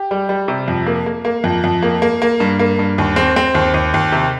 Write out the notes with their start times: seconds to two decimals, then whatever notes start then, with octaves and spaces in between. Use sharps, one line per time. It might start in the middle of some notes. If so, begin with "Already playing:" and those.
Already playing: G4
0.11 G3
0.29 G3
0.48 C3
0.68 F2
0.86 A#3
1.06 A#3
1.25 A#3
1.44 F2
1.64 F2
1.82 A#3
2.02 A#3
2.22 A#3
2.40 G2
2.59 A#3
2.79 G2
2.98 D#2
3.16 C4
3.36 C4
3.55 D#2
3.74 D#2
3.94 D#2
4.12 C3